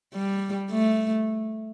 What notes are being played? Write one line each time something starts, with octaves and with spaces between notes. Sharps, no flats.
G3
A3